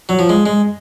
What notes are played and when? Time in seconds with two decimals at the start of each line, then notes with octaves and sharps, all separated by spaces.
0.09 F#3
0.19 F3
0.29 G#3
0.46 G#3